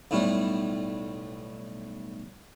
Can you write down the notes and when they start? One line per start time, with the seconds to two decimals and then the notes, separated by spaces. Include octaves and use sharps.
0.11 B1 A2 G3